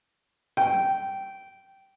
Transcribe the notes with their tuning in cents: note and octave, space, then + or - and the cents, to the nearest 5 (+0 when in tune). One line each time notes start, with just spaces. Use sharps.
G5 -15